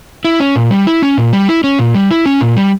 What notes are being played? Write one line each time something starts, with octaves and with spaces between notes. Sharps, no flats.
E4
C#4
A#2
G3
E4
C#4
A#2
G3
E4
C#4
A#2
G3
E4
C#4
A#2
G3